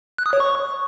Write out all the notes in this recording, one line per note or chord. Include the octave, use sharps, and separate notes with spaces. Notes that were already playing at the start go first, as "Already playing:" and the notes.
F#6
D#6
C#5
C#6